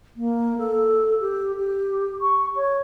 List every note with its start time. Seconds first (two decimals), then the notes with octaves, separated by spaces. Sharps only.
0.16 A#3
0.58 A4
1.20 G4
1.57 G4
2.22 C#6
2.56 C#5